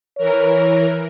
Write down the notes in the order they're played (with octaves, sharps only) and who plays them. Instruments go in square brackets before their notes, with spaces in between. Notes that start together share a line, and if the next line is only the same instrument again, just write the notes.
[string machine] E3 A#4 [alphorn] C#5